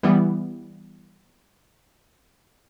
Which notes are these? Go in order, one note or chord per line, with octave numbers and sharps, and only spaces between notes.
E3 G3 B3